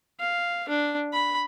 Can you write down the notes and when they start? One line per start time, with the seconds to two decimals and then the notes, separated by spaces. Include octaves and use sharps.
0.20 F5
0.69 D4
1.13 B5